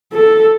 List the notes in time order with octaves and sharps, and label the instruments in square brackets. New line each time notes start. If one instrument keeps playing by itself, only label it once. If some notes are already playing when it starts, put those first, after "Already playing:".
[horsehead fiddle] A4